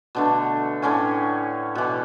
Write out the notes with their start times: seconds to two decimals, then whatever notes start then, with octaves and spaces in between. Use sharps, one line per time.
0.15 B2 D3 A3
0.82 A2 D3 C#4 G#5
1.75 B2 E3